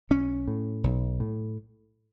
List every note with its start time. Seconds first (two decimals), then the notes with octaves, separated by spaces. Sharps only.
0.10 B1 C#4
0.48 A2
0.84 B1
1.20 A2